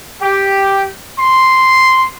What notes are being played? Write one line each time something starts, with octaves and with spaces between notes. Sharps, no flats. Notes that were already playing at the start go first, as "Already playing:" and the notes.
G4
C6